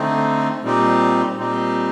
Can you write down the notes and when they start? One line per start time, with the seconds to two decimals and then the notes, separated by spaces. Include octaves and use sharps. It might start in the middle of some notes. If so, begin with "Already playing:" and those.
Already playing: D3 A3 C4 D#4
0.64 A#2 G3 C4 D#4 G4
1.37 A#2 G3 C4 D#4 G4